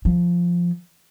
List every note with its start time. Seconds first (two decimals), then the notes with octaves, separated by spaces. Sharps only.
0.05 F3